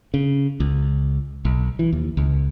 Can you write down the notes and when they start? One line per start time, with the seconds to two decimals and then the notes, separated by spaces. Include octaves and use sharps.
0.14 C#3
0.60 C#2
1.45 B1
1.79 E3
1.93 D#2
2.17 C#2